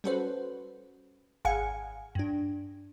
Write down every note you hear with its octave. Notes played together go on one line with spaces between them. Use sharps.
G3 C#4 F#4 A4 B4 C5
G#1 G#4 F5 F#5 G#5 C#7
G2 D4